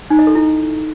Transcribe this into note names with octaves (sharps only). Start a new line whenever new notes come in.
D#4
D#5
A4
E4